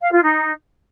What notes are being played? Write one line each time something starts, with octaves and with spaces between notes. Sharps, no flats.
F5
F4
D#4